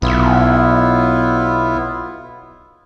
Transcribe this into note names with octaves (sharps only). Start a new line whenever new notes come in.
B1 B3 E4 F4